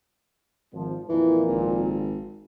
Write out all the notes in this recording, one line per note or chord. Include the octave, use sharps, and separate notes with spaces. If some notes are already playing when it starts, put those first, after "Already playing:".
G#1 F3
F2 A#2 E3
G#1